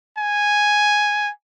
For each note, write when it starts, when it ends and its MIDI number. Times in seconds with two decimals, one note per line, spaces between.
0.18 1.30 80